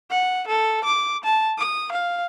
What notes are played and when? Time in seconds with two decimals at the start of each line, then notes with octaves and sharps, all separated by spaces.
0.10 F#5
0.48 A4
0.85 D6
1.24 A5
1.58 D#6
1.92 F5